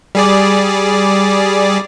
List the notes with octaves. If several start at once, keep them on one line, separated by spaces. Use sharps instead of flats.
G3 G#4 D5